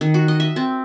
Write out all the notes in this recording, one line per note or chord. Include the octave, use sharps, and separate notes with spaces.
D#3
F#4
D#5
E5
C4